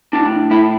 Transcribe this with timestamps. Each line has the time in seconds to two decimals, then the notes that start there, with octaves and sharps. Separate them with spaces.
0.13 A2 D4
0.51 A2 E4